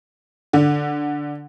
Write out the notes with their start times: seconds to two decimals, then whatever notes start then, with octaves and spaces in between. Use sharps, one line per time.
0.53 D3